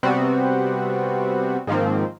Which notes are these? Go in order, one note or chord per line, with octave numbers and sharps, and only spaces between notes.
C3 G3 B3 C4 F#4
G#2 D#3 F3 A#3 C4